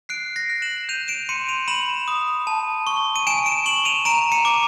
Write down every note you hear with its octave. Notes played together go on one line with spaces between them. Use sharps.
F#6 C7 D7
A#6 C7
F#6
E7 F#7
G6 D#7 F7
D7 E7
C6 C#7 D#7
D#7 F7
B5 E7 F#7
D#6
A5
C#6
D#7
G#5 D7 E7
D7 E7
C#6 E7 F#7
D#7 F7
A#5 D7 E7
C#7 D#7
D6